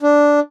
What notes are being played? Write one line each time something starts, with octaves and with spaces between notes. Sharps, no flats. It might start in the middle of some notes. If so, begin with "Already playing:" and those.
D4